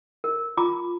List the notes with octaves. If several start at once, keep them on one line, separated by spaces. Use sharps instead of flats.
A#4
F4 A#5 D6